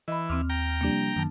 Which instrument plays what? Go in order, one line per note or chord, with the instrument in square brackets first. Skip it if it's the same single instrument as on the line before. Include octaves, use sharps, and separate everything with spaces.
[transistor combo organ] E3 [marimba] D#5 B5
[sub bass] D#2 [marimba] C4 C6 D6 [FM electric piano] F6
[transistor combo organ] G5 A#5
[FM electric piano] C3 F3 G3 [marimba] A#3 D4
[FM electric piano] F#2 A5 [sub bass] D#3